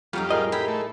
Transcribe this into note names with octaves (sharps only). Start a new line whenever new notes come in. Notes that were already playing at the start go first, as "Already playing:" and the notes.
F2 F#3 G3 D#4 F4
A2 G#4 A#4 D#5
E4 G4 B5
A3